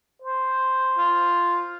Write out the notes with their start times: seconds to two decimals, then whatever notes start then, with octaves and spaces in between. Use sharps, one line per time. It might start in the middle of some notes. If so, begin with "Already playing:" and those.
0.22 C5
0.98 F4